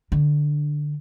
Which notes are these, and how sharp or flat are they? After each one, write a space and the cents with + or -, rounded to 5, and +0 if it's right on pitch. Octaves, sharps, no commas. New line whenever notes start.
D3 +10 D4 +0